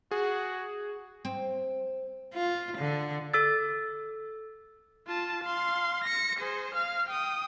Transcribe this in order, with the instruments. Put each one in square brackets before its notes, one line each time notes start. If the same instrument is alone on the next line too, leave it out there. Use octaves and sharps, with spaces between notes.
[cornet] F#4 [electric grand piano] G#4
[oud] C4
[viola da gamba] F4
D3
[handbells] A4 E6 A6
[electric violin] F4 A5
F5 C6
A#6 C#7
G#4 C5
F5 F6
G5 D#6